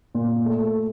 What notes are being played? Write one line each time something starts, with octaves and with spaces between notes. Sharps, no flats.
A#2
A3